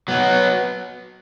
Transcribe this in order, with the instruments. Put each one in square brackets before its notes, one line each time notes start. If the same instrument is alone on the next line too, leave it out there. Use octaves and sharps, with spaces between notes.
[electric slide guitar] F#3 B3